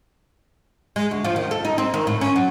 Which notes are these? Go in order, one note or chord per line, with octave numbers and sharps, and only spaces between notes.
G#3
D2
F3
D#3
A4
D#4
C4
D#3
A2
C#4
F#3